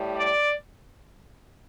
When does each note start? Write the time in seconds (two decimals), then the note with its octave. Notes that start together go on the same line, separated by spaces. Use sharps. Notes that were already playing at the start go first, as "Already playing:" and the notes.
Already playing: A2 G3
0.16 D5